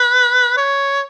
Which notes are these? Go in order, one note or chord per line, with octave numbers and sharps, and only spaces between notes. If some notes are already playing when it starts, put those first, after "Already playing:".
Already playing: B4
C#5